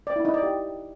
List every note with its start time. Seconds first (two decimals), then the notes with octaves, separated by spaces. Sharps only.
0.07 D5
0.16 E4
0.25 D#4
0.34 D5
0.43 G4